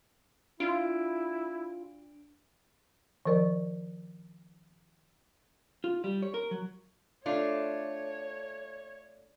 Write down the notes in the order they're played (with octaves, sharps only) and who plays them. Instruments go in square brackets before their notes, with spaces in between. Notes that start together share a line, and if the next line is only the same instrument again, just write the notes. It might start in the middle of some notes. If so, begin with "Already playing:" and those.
[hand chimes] D4 D7 [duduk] E4 [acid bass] F4
[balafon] D#3 F3 A#4 D5
[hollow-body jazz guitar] F4
G3
C#5
A#4
F#3
[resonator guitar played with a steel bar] A3 D4 F4 [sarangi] C#5